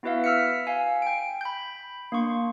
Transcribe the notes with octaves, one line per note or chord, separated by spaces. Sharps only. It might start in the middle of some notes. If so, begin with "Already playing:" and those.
B3 E4 F#4 B4 E5 F5
E6 F6 B6 C#7
F5 G#5
G5 D7
B5 G6
A#3 D4 C6 C#6